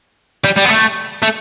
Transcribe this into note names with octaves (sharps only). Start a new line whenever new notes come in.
G3
G3
B3
A3
A3